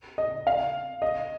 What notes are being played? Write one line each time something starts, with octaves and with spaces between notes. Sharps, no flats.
D#5
F5
D#5